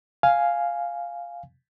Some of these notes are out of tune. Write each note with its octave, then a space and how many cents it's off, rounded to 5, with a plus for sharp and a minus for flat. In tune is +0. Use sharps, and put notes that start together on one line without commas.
F5 +0 G#5 +0